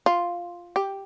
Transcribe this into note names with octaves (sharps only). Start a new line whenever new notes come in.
F4
G4